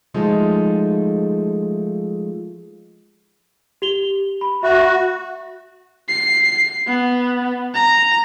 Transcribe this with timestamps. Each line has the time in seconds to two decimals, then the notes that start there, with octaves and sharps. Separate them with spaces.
0.14 F3 G#3 A3 D#4
3.82 G4 F7 G7
4.41 B5
4.63 F#4 E5 F#6
6.09 C7
6.87 B3
7.74 A#5